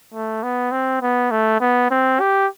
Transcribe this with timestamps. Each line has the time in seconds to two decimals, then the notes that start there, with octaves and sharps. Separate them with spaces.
0.14 A3
0.43 B3
0.72 C4
1.02 B3
1.31 A3
1.61 B3
1.91 C4
2.20 G4